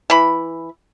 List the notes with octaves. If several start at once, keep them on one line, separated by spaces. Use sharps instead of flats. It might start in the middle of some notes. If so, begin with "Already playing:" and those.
E3 B5